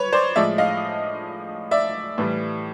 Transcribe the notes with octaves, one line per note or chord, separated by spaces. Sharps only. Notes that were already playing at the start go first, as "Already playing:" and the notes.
Already playing: B4 C#5
C5 D5
A2 F3 G#3 D5 E5
D#5 F5
D5 E5
A2 E3 G3